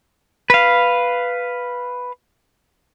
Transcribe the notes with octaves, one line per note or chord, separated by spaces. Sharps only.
B4 F5